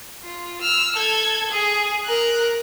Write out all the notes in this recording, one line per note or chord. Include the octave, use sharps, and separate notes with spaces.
F4
E6 F6
A4 G#6
G#4
A#4 F#6